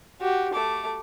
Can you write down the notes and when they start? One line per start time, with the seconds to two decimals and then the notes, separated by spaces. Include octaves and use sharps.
0.21 F#4 G4
0.54 A3 D6